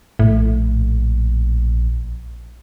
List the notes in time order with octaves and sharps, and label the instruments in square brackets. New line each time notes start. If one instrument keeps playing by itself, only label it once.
[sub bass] A#1 [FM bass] A2